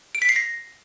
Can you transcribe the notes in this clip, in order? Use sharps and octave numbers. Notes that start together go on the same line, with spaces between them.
D7
B6
C7
A#6